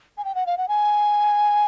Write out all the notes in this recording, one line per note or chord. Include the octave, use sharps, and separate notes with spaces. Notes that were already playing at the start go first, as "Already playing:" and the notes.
G#5
G5
F#5
F5
F#5
G#5